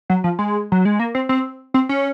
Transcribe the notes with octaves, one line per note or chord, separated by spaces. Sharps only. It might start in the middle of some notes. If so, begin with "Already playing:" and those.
F#3
F3
G#3
F#3
G#3
A#3
C4
C4
C4
C#4